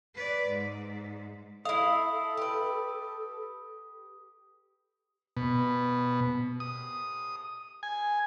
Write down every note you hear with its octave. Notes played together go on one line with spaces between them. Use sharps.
B4 D5
G#2
E4 A4 F5 D#6
G4 B4
B2
D#6
G#5